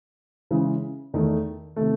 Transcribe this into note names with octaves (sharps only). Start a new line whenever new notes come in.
C#3 E3 G#3
E2 D#3 A3
C3 D#3 A3